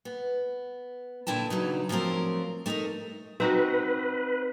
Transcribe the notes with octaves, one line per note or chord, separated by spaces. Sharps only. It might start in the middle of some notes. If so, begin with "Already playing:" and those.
B3
A#2 D3 E4 G5 A5
E2 C#3 F#3 D#4
F3 F#3 A3 C4 A#4
A3 D#4 G4 A#4 D#5
C4 D#4 F#4 B4